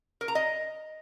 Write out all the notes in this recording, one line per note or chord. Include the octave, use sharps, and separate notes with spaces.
A#4
A#5
D#5